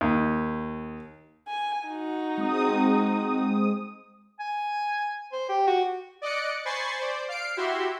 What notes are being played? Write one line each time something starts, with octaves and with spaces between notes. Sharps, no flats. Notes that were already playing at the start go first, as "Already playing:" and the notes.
D#2
G#5
D#4 F#4
G#3 C4 D#6
G#5
C5
G4
F#4
D5 D#5 D6 F#6 C#7
C5 G#5 B5 C#6 A6 C7
C5 D5
F5 C7 D7
E4 F#4 G4 E5 C6